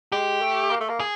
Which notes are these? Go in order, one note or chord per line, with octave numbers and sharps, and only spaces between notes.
G#3 G4
A3
A#3
A3
A#3
G#4